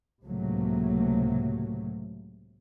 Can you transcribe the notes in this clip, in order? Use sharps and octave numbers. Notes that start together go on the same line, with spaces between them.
C#2 A2 C3 F#3 A3 A#3